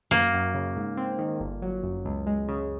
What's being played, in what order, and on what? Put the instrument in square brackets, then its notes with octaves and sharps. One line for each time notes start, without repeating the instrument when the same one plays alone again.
[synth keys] F#2 [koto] A#3
[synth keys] F#2
C#3
G#2
C4
D#3
G1
F#3
F#2
C#2
G#3
C#3